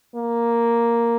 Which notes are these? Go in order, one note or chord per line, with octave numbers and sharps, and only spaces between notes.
A#3